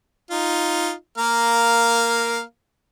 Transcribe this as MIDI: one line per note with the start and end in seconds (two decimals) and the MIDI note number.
0.31 0.92 63
0.31 0.92 65
1.18 2.41 58
1.18 2.41 70
1.18 2.41 77